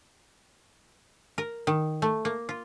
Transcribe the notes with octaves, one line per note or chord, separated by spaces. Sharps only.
A#4
D#3
A3
A#3
F4